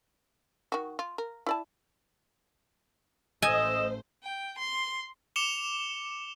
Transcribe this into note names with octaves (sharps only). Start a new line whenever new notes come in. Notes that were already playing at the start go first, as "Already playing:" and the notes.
D#3 F#4
F4
A#4
E4 D5 A5
A1 A3 C5 D#5 G#5 E6
G5
C6
D6 C#7 E7 F7 G7